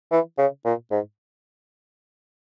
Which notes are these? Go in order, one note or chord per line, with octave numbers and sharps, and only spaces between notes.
E3
C#3
A#2
G#2